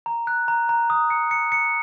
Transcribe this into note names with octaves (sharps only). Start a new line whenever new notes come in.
A#5
F#6
A#5
A#5
D#6
C#7
C#7
C#7